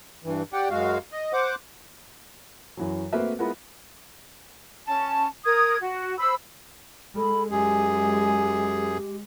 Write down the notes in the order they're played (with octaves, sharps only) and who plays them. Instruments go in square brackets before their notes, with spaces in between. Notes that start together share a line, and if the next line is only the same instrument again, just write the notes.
[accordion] G2 E3
G4 D5 F#5 G5
F#2 G#3 F#4 F5
D#5
C5 F#5 D6
[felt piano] F#2 E3 F#3
A3 A#3 C4 F#4 B4 E5
G#3 B3 E4 F4 A#4 F#5
[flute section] C#4 A5
A#4 D#6 G#6
F#4
C5 B5 E6
[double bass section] G#3 [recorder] A4 [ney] B5
[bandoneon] F#2 G#4 [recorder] G4 [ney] G#5